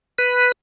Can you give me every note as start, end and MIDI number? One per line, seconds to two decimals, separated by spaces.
0.18 0.52 71